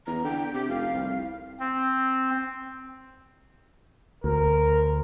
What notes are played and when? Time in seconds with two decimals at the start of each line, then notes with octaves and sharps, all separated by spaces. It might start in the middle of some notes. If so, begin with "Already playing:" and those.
0.07 E2 A#5
0.24 D3 G5
0.54 C3 G4
0.69 F1 F5
0.93 C2
1.60 C4
4.24 D2 A#4